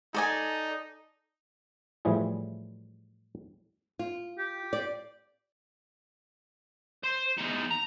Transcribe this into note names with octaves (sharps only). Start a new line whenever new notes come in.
D#4 A4 D5 G#5
A2 E3 F3 G3 G#4
F4
G4
F4 D5
C5
E2 D#4
A#5